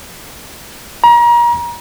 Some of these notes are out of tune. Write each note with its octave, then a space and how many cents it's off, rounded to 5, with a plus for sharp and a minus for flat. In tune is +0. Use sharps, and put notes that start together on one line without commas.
A#5 +30